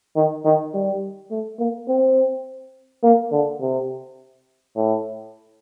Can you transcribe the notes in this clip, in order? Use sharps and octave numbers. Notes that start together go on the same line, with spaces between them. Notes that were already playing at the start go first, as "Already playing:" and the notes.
D#3
D#3
G3
A3
A#3
C4
A#3
D3
C3
A2